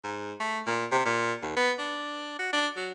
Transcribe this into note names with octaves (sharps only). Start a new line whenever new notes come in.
G#2
A3
A#2
C3
A#2
D#2
B3
D4
F#4
D4
F#3